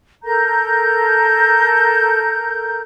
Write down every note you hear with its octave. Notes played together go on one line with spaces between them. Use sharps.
A4 A#4 A#5 G6